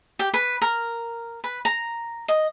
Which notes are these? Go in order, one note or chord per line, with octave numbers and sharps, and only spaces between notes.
G4
B4
A#4
B4
A#5
D#5